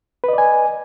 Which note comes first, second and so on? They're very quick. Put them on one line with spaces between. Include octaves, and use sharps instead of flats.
B4 D#5 D5 G#5